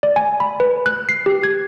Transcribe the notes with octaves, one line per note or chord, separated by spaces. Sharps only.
D5
G#5
B5
B4
F#6
C7
G4
G#6